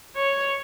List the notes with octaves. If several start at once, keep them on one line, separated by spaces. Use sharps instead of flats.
C#5